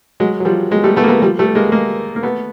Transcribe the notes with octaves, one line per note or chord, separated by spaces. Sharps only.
F#3 G#3
F#3
F3 G3
F#3 G#3
G3 A3
A3 B3
A#3
A3 B3
F3 G3
G3 A3
G#3 A#3
G#3 A#3
A#3
A3 B3